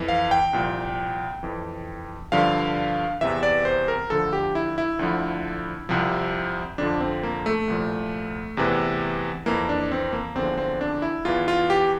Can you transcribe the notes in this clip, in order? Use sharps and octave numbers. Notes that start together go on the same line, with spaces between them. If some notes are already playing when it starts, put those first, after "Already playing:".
Already playing: F2 E3
F5
G5
C2 A#2 F3
F2 E3
G2 D3 F3 F5
E2 C3 E3 E5
D5
C5
A#4
D2 D3 F3 A4
G4
E4
E4
D2 D3 F3
C2 C3 F3
F2 D3 F3 D4
C4
A#3
A3
C2 A#2 F3
E2 C3 E3
F2 E3 A#3
D4
C4
A#3
E2 D3 F3 C4
C4
D4
E4
E2 E3 F4
F4
G4